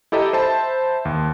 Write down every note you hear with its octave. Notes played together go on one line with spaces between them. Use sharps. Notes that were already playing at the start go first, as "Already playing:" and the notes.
E4 G4 A4 D#5 E5 A#5
C5 E5 A5 B5
D#2